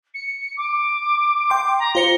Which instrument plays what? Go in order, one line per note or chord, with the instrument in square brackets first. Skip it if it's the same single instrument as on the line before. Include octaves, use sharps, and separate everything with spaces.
[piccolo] C#7
D6
[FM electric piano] G5 C6
[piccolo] A#5
[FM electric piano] F4 C5 C#7 [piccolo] G7